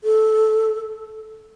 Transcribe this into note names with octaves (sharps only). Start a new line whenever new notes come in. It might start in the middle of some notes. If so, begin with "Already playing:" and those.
A4